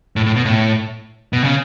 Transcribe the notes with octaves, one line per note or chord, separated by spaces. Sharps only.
A2
A2
B2
A2
B2
C#3